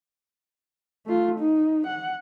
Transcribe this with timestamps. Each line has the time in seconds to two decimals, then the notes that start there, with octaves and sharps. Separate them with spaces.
1.06 A3 F4
1.39 D#4
1.86 F#5